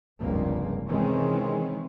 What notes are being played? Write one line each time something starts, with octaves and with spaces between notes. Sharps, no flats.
F1 C#2 G2 A#3
C3 D#3 E3 G#3 C4 C#4